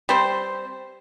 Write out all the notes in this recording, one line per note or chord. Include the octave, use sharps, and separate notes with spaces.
G3 C4 C5